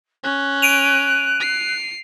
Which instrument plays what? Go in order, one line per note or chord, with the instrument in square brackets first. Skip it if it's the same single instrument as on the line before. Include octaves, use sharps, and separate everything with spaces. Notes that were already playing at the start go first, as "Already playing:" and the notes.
[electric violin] C#4 [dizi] F#6
[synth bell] D7 D#7 F7
[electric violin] C7